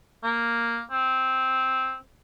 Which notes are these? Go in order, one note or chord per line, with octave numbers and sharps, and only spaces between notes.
A#3
C4